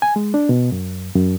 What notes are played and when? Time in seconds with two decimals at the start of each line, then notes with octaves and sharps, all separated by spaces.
0.02 G#5
0.16 G#3
0.34 D4
0.49 B2
0.72 F#2
1.15 F#2